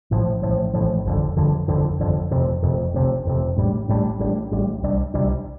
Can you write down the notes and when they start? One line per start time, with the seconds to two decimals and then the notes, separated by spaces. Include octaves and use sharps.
0.11 A1 A2 F3
0.42 A1 A2 F3
0.74 A1 A2 F3
1.05 G1 F2 D3
1.37 G1 F2 D3
1.68 G1 F2 D3
1.99 G1 F2 D3
2.31 F1 F2 C3
2.62 F1 F2 C3
2.94 F1 F2 C3
3.25 F1 F2 C3
3.57 A1 A2 G3 D4
3.88 A1 A2 G3 D4
4.19 A1 A2 G3 D4
4.52 A1 A2 G3 D4
4.83 C2 C3 G3 D4
5.14 C2 C3 G3 D4